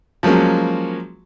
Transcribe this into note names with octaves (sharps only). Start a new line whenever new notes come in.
F3 F#3 G#3 A#3 C#4